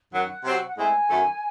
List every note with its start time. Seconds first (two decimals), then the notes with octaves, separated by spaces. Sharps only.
0.13 F#2 D#3 F#3 F#5
0.44 C3 F#3 C4 F#4
0.66 F#5
0.77 A2 G#3 C4 E4 G#5
1.09 F#2 D#3 A3